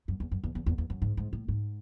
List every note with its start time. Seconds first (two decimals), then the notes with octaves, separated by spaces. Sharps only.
0.08 F#2
0.20 E2
0.31 F#2
0.44 E2
0.55 E2
0.66 E2
0.78 E2
0.90 F#2
1.02 G#2
1.17 G#2
1.33 A2
1.48 G#2